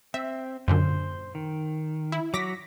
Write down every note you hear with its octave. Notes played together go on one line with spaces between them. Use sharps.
C4 E5
F#2 A#2 D3 C5
D#3
E4
F#3 F#4 D6 A#6 B6